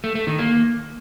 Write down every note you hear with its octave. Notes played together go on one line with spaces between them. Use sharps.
A3
A3
D#3
A#3